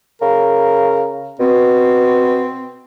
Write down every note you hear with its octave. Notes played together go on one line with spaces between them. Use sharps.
C#3 A#4
B2 C4